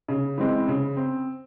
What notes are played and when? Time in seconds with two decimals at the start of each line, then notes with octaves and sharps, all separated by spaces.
0.08 C#3
0.38 E3 G#3 C4
0.68 C#3
0.97 C4